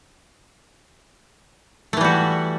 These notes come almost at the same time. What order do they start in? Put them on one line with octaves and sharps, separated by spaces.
A3 E3 G3 F#4